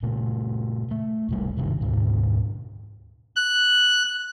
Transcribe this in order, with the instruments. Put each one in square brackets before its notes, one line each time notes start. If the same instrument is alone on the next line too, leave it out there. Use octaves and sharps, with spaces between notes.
[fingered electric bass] A#2 C#3 A3
A3
E1 C2 G3
F#1 G2 C3 D#3
D2 G#2 B2 D3
[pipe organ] F#6